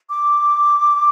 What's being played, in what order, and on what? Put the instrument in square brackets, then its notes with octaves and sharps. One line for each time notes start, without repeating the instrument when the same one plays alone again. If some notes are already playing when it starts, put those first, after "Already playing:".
[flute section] D6